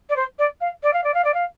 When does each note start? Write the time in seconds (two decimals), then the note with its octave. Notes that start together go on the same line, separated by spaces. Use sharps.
0.09 D5
0.16 C5
0.39 D5
0.61 F5
0.83 D5
0.93 F5
1.04 D5
1.14 F5
1.25 D5
1.34 F5